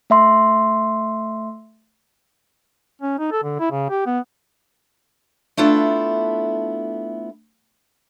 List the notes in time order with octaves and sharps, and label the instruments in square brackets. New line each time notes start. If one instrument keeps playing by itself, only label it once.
[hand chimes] A3 E5 C6
[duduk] C#4
D#4
A4
D3
E4
C#3
G4
B3
[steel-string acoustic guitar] A3 B3 D4 E4 F4 A4